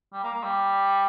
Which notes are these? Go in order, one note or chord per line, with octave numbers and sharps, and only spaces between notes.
G3
A#3
A#3
G3